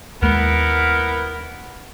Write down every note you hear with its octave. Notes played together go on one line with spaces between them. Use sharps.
D#2 G#3 A#3 B3 E4 A#4